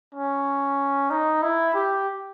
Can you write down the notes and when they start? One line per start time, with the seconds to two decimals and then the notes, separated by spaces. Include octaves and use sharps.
0.14 C#4
1.10 D#4
1.42 E4
1.74 G4